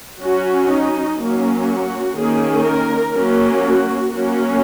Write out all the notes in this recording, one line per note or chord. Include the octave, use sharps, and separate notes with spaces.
F#3 C#4 F#4
D#4
F#3 A#3 C#4
F#4
D#3 A#3 C#4 G#4
A#4
F#3 A#3 C#4
F#4
F#3 A#3 C#4 F#4